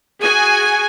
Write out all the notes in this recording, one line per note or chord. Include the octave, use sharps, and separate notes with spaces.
F#4 G#4 G#5